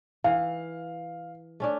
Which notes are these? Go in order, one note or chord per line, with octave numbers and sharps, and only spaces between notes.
E3 F5
A3 C#4 D4